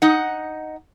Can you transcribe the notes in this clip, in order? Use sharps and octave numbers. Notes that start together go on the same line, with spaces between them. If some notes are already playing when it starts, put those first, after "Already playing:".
D#4 D#5 F#5